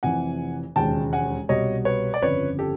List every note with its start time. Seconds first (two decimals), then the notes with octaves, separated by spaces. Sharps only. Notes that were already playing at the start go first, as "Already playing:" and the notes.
0.03 F1 F2 C3 E3 F#5 G#5
0.76 E1 D#2 C#3 F3 G#3 G5 A5
1.13 F#5 G#5
1.49 C2 B2 G3 C#5 D#5
1.85 B4 C#5
2.14 D5
2.22 G1 F2 C#3 B4 C#5
2.59 G4 A4